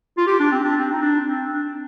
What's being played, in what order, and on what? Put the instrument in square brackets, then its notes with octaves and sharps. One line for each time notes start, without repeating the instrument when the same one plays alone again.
[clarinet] F4
G4
D4
C4
D4
C4
D#4
D4
C4
D4